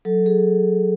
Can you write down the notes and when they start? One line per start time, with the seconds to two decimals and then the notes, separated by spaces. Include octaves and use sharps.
0.05 F#3 A4
0.26 G#4